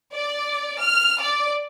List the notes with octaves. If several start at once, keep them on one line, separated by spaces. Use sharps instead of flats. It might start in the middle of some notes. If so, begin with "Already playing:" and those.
D5
F6
D5